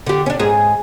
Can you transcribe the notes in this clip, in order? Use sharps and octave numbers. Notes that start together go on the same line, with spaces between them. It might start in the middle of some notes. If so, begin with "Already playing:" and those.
D3 G4
C#4 D4
G#2 G#4